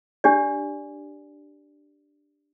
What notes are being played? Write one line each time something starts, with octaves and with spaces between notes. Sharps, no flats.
D4 G4 D5